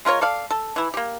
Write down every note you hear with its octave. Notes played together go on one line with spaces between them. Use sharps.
G#3 F4 A#4 C#5
A4 D5 F5
A4
E3 E4
A#3 G4